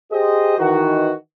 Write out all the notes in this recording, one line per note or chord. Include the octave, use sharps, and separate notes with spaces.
G4 G#4 C5 D#5
D#3 E3 F#4